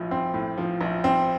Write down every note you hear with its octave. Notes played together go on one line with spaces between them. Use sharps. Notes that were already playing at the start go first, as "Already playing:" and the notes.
Already playing: A#1 A2 F3
C4
A2
F3
A#1
C4